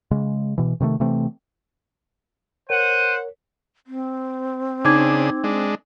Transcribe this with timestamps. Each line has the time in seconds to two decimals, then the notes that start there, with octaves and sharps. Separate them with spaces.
0.11 C#3 G#3
0.58 B2 E3
0.80 C3 D#3 F3 A3
1.00 C3 E3 A3 C4
2.70 A#4 C5 C#5 F#5 D#7
3.87 C4
4.85 C#3 D4 D#4 G#4 D6 G#6
5.44 G#3 D4